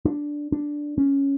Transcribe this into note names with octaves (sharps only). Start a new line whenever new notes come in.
D4
D4
C#4